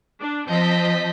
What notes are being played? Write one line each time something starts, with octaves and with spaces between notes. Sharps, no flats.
D4
F3 C4 D#5 A5 G6 B6